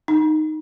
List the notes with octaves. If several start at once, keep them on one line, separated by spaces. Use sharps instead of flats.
D#4